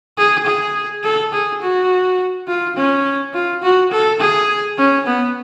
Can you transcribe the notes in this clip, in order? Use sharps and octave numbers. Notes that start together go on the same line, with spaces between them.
G#4
G#4
A4
G#4
F#4
F4
C#4
F4
F#4
A4
G#4
C#4
B3